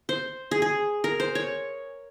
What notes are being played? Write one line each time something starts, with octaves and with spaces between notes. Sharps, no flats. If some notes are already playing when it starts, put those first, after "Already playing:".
C5
G#4
G#4
A#4
C5
C#5